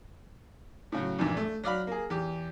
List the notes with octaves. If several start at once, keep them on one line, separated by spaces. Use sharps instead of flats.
A2 C#3 F#3
A#1 E2 G2 A#2
A3
F#3 D5 F5 B5
A#3 G#4
E2 G4